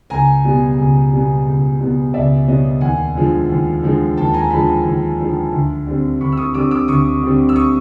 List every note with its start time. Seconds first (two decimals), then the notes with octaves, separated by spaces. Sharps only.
0.10 C#2 G#5 A#5
0.45 B2 G3 B3
0.78 C#2
1.12 B2 G3 B3
1.47 C#2
1.80 B2 G3 B3
2.13 C#2 D5 E5
2.47 B2 G3 B3 C#5 D#5
2.81 D#2 F#5 G#5
3.16 D3 F3 G#3
3.49 D#2
3.83 D3 F3 G#3
4.17 D#2 G5 A5
4.33 G#5 A#5
4.50 D3 F3 G#3 A5 B5
4.85 D#2
5.19 D3 F3 G#3
5.52 D2
5.86 D3 G3 C4
6.20 D2 B5 C#6
6.32 E6
6.37 C#6 D#6
6.54 D3 G3 C4 D6 E6
6.71 D6 E6
6.88 D2 C#6 D#6
7.22 D3 G3 C4
7.49 E6
7.56 C#6 D#6